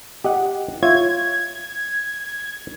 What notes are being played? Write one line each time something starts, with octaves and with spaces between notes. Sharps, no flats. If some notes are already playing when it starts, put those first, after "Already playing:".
G4 D#5 F#5
F4 C#5 E5 G#6